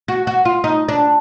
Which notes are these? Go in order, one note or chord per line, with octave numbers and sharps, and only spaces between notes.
F#4
F#4
F4
D#4
D4